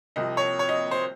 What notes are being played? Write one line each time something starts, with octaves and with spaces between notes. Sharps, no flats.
C2 C3 F3 D#5
C#5
C#5
D#5
C5